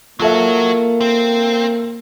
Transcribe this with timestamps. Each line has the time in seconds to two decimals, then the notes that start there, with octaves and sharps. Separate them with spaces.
0.19 F#3 A#3 F4 F#4 A4 E5
1.01 C4